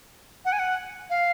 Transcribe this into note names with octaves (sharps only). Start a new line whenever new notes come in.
F#5
G#5
F#5
F5